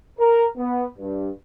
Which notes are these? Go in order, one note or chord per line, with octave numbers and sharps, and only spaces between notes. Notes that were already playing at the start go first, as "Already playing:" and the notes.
A#4
B3
G2